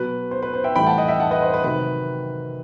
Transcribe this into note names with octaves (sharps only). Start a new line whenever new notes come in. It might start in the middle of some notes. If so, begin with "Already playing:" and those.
Already playing: B2 F#3 B4
C5
B4
C5
E5 G5
A2 E3 G3 G5 B5
F#5 A5
D#5 F#5
E5 G5
F#5 A5
B4 D#5
C5
B4
C3 D#3 F#3 B4